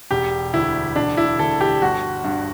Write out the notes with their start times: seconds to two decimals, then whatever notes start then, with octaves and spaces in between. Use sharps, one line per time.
0.11 E1 G4
0.54 D2 E4
0.96 E1 D4
1.17 E4
1.39 D2 A4
1.61 G4
1.82 G1 F#4
2.24 G2